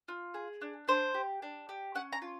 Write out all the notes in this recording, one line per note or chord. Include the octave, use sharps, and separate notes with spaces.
F4
G#4
D4
D4 C5
G4
D4
G4
C#4 F#5
A#5
F4